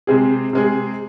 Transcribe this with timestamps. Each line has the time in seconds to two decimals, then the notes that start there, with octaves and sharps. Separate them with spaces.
0.07 C3 G#3 C4 G#4
0.53 C3 G#3 C4 G#4